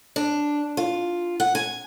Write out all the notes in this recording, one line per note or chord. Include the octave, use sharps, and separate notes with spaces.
D4
F4
F#5
G#5